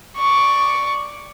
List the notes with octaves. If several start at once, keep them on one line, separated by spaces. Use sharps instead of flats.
D5 C#6